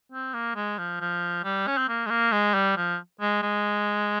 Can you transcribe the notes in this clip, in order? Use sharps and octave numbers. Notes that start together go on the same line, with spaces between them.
C4
A#3
G#3
F3
F3
G3
C#4
C4
A#3
G#3
A#3
G#3
G3
F3
G#3
G#3